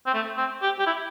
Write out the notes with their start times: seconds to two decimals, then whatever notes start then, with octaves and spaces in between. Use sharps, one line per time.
0.06 C4
0.14 A3
0.37 C4
0.62 G4
0.79 G4
0.87 E4